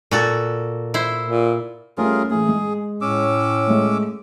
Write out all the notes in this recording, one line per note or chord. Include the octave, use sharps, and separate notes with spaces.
A#2 F#4 A4
E4 C5
A#2
G3 A3 C#4 F4 G#4 A#4
A2 E3 G#4
G#3
A2 C#4 D6 E6
G#3 A3